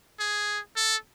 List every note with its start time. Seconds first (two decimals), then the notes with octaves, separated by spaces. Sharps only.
0.20 G#4
0.76 A4